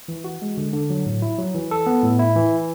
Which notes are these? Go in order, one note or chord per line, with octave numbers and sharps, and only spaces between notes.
E3
F#4
G#3
D3
D3
F#3
A2
E4
F#3
E3
A4
B3
A2
E4
E3